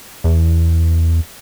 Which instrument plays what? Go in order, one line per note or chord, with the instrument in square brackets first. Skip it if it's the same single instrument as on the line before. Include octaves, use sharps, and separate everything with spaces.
[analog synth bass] E2